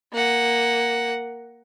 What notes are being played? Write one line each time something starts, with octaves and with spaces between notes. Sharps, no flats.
A#3 F#5